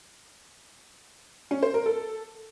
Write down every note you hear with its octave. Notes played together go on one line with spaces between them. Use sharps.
C#4
C5
A#4
A4